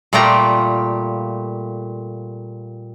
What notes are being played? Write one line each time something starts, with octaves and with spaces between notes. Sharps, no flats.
A#2 G3 A3 F4 G5 A#5